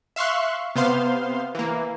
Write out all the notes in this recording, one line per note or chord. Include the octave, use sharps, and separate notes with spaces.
E5 F5 C6 C#6 F#6
C3 B3 C5 F5 C6
E3 A#3